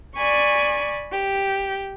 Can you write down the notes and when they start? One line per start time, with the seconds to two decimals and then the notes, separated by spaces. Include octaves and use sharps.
0.17 D5 G#5 B5 C#6
1.12 G4